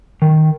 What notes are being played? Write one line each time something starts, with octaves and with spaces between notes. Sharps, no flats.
D#3